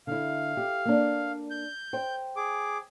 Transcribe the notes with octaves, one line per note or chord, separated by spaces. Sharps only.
D3 E4 F5
G4
A#3 D4
G6
C5 G5
G#4 D6